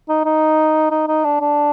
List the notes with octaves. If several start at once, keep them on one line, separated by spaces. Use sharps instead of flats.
D#4
D#4
D#4
D#4
D4
D4